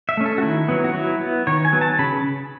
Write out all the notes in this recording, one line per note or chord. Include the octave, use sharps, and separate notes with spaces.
E5
A3 C#4
A4
F#4
D#3 E4
F#3 B3
F#4
F#3 E4
B3
D#3 C#5
G#5
F#3 B3
A5
C#3 B5